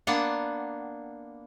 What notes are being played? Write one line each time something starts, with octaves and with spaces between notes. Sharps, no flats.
A#3 B3 D4 F#5